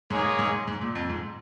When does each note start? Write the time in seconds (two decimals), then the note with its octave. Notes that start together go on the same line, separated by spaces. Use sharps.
0.10 G#2 A#3 D#4 G#4 C#5
0.39 G#2
0.67 G#2
0.81 A#2
0.95 F2
1.10 G#2